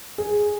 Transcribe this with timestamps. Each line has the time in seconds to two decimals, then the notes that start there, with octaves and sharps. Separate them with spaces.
0.18 G#4